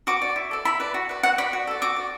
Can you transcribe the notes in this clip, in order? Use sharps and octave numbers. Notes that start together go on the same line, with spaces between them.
F#4 D6
D5
E4
A4 D5
E4 B5
B4 D5
F#4
B4 D5
F#4 F#5
D5 B5
F#4
A4 D5
F#4 D6
D5